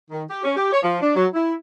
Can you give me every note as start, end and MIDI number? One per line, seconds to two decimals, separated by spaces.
0.11 0.23 51
0.30 0.40 67
0.44 0.54 61
0.56 0.71 67
0.72 0.79 73
0.83 0.97 53
1.02 1.12 62
1.15 1.26 54
1.33 1.54 64